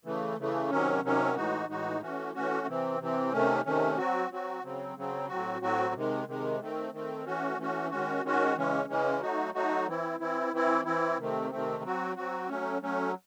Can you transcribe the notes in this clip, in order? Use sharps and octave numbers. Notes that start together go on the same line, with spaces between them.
C#3 E3 A3
C#3 E3 A3
C3 D#3 F#3 C#4
C3 D#3 F#3 C#4
A2 E3 G#3 D#4 F#4
A2 E3 G#3 D#4 F#4
E3 A3 C#4 F#4
E3 A3 C#4 F#4
C3 E3 C4
C3 E3 C4
C3 D#3 A3 C#4
C3 D#3 A3 C#4
F#3 C4 F#4
F#3 C4 F#4
C#3 F#3 C4
C#3 F#3 C4
A2 F#3 C4 F#4
A2 F#3 C4 F#4
C3 D#3 G#3
C3 D#3 G#3
D#3 A3 C4
D#3 A3 C4
E3 A3 C#4 F#4
E3 A3 C#4 F#4
D#3 G#3 C#4 F#4
D#3 G#3 C#4 F#4
C#3 E3 G#3 C#4
C#3 E3 G#3 C#4
F#3 A3 D#4 F#4
F#3 A3 D#4 F#4
E3 C4 E4
E3 C4 E4
E3 C4 E4
E3 C4 E4
C3 D#3 A3 C4
C3 D#3 A3 C4
F#3 C4 F#4
F#3 C4 F#4
F#3 A3 C#4
F#3 A3 C#4